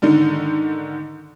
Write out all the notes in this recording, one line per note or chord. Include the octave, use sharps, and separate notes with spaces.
G#2 D3 D#3 D#4